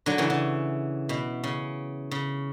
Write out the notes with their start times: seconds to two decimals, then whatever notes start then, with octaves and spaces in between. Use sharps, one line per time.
0.06 D3 F#3
0.18 C#3 E3
0.30 C#3
1.09 B2
1.44 C#3
2.11 C#3